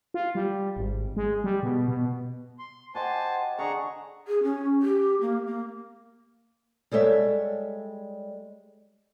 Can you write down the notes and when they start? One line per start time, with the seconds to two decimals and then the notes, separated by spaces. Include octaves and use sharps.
0.14 F4
0.35 G3
0.77 G#1
1.17 G#3
1.44 G3
1.63 B2
1.88 B2
2.59 C6
2.95 F#4 G4 C5 D#5 G#5 A5
3.59 D3 G#4 F#5 A5 A#5 C#6
4.28 G#4
4.43 C#4
4.82 G4
5.21 A#3
5.47 A#3
6.91 G3 G#3 A4 C#5 E5